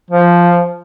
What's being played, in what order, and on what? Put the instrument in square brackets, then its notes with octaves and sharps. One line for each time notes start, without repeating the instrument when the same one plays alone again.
[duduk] F3